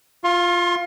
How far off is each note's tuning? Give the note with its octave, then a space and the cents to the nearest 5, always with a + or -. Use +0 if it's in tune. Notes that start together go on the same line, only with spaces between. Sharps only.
F4 +0 C6 +35